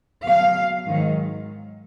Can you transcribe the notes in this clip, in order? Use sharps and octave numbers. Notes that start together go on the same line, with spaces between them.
B2 F#3 F5
G#2 D#3 F#3